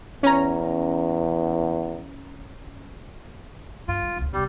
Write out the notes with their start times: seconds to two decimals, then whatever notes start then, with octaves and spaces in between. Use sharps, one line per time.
0.23 E2 C#4 A#5
3.88 G2 F4
4.03 G#3
4.16 E1 D2
4.33 E1 C3 G3